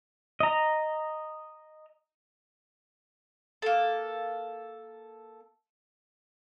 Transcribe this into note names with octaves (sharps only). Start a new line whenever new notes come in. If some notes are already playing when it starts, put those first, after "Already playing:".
D#5 A#5
A#3 A4